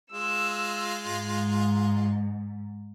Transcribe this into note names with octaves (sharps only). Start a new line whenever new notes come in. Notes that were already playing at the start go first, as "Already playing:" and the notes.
G#3 F4 E6
G#2